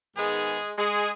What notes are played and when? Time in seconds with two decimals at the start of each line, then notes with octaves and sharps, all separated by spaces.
0.15 G#2 D#3 G#3 B3 G#4
0.78 G#3 G#4